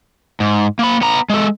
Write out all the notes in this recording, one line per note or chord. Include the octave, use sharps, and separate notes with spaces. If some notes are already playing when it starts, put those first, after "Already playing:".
G#2
A#3 B5
B3 A#5
G#3 A4